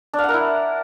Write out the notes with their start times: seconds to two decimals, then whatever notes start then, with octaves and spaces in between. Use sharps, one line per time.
0.13 D4
0.19 F5
0.24 F#5
0.29 A#4
0.34 E4